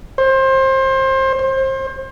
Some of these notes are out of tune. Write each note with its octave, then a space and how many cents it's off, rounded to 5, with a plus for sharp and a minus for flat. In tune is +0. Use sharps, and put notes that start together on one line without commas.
C5 +25
C5 +30